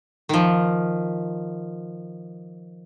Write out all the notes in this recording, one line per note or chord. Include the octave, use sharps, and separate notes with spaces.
D#3 F3